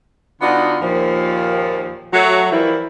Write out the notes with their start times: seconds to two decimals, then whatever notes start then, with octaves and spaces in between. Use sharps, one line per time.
0.41 D3 B3 D4 D#4 F4 F#4
0.82 D#2 A#2 D#3 F3
2.13 F#3 A3 F#4
2.52 E3 F3 G3 A#3 E4